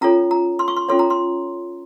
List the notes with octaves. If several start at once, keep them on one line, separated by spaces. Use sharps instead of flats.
C#4 F4 A4 C#5 A#5
A#5
C6
C#6
C6
C#4 F4 A4 C#5 C6
A#5
C6